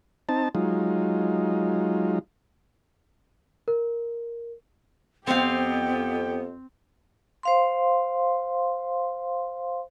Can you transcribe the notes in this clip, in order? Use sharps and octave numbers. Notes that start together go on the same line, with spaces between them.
C4 D#4 A5
F#3 G#3 D#4 F4
A#4
F2 B3 C4 G4 F5 G5
C5 F5 C6